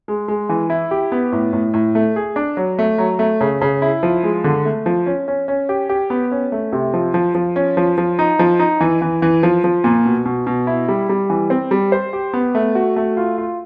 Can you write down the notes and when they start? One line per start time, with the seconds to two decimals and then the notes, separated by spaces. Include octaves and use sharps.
0.08 G#3
0.28 G#3
0.49 E3
0.70 E4
0.91 G4
1.12 B3
1.32 A2
1.53 A2
1.74 A2
1.95 A3
2.16 G#4
2.36 D4
2.57 F#3
2.79 A3
2.98 F#3
3.19 A3
3.41 C#3
3.61 C#3
3.82 E4
4.03 F3
4.23 G#3
4.44 D3
4.65 A3
4.86 F3
5.06 C#4
5.28 C#4
5.48 C#4
5.69 G4
5.89 G4
6.10 B3
6.32 C#4
6.52 A3
6.72 C3
6.94 F3
7.14 F3
7.35 F3
7.56 C#4
7.77 F3
7.98 F3
8.19 D#4
8.39 F3
8.59 D#4
8.81 E3
9.02 E3
9.22 E3
9.43 F3
9.64 F3
9.84 A#2
10.05 B2
10.26 B2
10.47 B2
10.67 E4
10.88 G3
11.09 G3
11.30 E3
11.50 C4
11.71 G3
11.92 C5
12.13 G4
12.33 B3
12.55 A3
12.75 F#4
12.96 A3
13.17 F4
13.38 F4